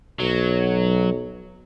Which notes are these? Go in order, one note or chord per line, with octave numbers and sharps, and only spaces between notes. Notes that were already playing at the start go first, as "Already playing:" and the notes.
B1 F#3